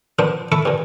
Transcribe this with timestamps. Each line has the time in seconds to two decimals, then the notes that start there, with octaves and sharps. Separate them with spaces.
0.19 F3 A#3 B3 D4 C5
0.52 E4 A4 B5 C#6
0.65 G2 A#2